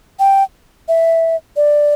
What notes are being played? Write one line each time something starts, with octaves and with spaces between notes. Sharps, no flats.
G5
E5
D5